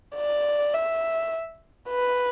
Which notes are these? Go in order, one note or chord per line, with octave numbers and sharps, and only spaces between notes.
D5
E5
B4